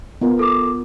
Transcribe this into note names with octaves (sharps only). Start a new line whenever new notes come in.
B3 F4 A#4
A4 D6